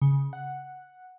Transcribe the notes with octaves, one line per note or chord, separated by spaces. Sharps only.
C#3
F#5